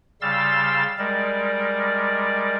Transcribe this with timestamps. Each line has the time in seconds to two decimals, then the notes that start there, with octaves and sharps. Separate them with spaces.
0.22 C#3 G3 F5 C6 E6 A6
0.98 G3 G#3 A#4 D5